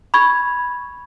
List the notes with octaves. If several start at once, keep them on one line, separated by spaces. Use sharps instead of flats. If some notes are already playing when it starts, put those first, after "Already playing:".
B5 C#6 G#6